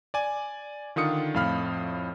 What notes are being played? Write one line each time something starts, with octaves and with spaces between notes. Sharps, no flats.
D5 G#5
D3 D#3 F4 D#6 C#7
F2 A2 F5 B5 F6